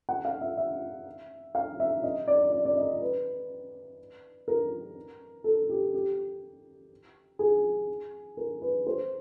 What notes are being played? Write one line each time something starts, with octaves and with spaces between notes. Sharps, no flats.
F#5
F5
E5
E5
F5
E5
D#5
D5
D5
D5
D#5
B4
A#4
A4
G4
G4
G#4
A#4
B4
C5